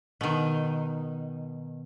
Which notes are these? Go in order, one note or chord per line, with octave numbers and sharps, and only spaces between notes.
B2 D#3